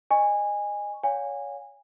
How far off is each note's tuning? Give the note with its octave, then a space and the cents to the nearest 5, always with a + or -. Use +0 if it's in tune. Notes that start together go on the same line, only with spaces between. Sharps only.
D#5 -25 G#5 -20 C#6 +0
C#5 +25 F5 +40 G#5 -25